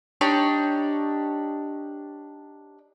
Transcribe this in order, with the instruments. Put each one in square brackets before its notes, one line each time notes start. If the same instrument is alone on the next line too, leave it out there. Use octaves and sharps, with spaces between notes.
[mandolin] D4 D#4 G4 C#5